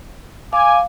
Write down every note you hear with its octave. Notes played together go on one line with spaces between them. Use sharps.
F5 G#5 D6